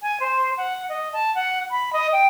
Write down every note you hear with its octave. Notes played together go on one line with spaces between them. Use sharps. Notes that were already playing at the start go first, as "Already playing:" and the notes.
G#5
C5
F#5
D#5
A5
F#5
B5
D#5
G5